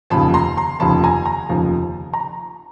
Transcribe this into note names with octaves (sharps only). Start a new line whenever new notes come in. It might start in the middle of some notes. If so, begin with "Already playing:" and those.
F1 D#2 C#3 F3 A5 B5
A#5 C6
A#5 C6
F1 D#2 C#3 F3 A5 B5
G#5 A#5
G#5 A#5
F1 D#2 C#3 F3
A#5